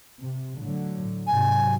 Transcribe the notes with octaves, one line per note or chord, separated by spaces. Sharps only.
C3
A2 D3 F#3
G#2 C3 F#3 G#5